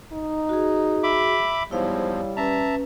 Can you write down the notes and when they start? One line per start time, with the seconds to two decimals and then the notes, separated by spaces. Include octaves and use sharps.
0.13 D#4
0.49 F#4 G#4
1.03 E5 B5 D6
1.71 E2 G#2 F3 G3 E4 C#5 F5
2.37 C#4 B4 E5 A5 A#5